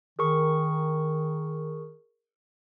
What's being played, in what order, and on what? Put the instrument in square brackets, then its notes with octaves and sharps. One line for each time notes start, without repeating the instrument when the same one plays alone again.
[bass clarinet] D#3 [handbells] G#4 A#4 C#6